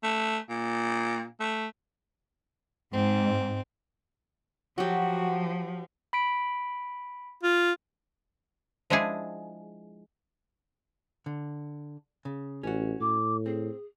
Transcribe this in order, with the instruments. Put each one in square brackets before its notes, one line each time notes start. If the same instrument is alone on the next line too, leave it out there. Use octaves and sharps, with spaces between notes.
[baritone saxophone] A3
A#2
A3
[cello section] G#2 [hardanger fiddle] C4
[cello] F3 [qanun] F#3 G4 [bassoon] F#4
[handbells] B5 B6 D7
[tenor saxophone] F4
[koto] F3 G#3 D4 E4 G#4
[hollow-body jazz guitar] D3
C#3
[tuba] A1 [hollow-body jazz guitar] C#4 F#4
[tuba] A2 [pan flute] D6
[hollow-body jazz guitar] C4 [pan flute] G#4